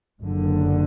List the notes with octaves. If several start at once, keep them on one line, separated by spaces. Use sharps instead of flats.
F#1 F#2 D3